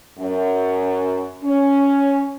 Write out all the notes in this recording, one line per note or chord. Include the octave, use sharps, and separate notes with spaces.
F#2
C#4